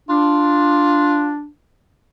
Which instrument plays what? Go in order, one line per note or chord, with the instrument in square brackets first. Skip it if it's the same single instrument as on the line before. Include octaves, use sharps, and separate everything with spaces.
[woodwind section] D4 [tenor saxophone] F4